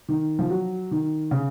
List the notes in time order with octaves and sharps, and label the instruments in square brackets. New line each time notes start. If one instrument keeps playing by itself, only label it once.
[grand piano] D#3
F3
F#3
D#3
C#3